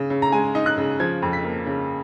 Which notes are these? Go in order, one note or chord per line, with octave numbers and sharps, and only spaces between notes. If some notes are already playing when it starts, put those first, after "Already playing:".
Already playing: C#3
C#3
A#5
G#3 G#5
D#4
F#6
C#3
F3 G#6
F2
B6
A#3
C#3